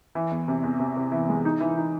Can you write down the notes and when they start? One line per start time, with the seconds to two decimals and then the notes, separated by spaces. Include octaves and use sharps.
0.15 E3
0.31 E2
0.48 C3
0.64 E2
0.80 C3
0.96 C3
1.12 E3
1.29 G#3
1.45 D#4
1.61 E3
1.78 D#4